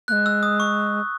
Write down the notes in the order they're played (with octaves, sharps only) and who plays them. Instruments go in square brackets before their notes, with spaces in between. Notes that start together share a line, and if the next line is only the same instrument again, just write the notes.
[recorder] A#3 [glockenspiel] F#6
[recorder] G#3
[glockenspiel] E6
D#6
C#6